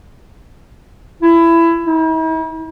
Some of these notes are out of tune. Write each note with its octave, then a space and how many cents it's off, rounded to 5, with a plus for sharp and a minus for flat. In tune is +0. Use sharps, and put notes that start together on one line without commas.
E4 +20
E4 -45